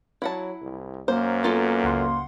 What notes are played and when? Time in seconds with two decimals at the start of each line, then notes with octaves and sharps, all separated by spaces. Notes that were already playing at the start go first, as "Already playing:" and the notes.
0.22 F#3 E4 F#5 A5
0.62 C2
1.08 F#2 A#3 C5
1.43 B3 F4 A4
1.84 C#2 F#5 C6